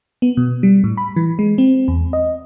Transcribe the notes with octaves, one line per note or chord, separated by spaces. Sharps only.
B3
B2
G3
A2
B5
E3
G#3
C4
E2
D#5